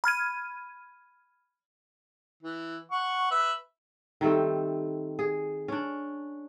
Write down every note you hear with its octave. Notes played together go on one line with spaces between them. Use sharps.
B5 F6 G#6 D#7
E3
F#5 C#6
B4 E5
D#3 G3 A3 C4
G#4
C#4 D4